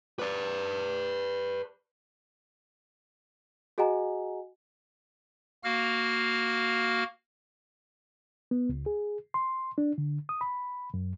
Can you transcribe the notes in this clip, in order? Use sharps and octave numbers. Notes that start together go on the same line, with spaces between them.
B4 D5
F#4 G#4 D#5 F#5 G#5 A#5
A#3 F#4 F5 F6
B3
C#2
G#4
C6
D4
D3
D#6
B5
F#2